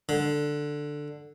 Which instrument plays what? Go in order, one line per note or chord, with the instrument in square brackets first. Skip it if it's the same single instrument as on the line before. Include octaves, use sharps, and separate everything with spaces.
[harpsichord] D3